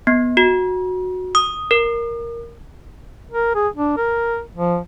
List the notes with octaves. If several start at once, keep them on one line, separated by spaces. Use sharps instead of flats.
B3
F#4
D#6
A#4
A#4
G#4
D4
A#4
F3